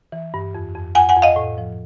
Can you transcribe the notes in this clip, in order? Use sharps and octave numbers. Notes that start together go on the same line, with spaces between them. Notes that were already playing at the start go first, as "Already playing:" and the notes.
E3
G2
F2
F2
F2 F#5 G#5
F#5 G#5
F2
D#5 F5
A2
F3